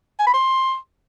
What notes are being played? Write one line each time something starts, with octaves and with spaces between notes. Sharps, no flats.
G#5
B5
C6